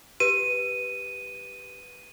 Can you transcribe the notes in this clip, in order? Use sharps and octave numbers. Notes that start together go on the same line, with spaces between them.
G4 B4 D#7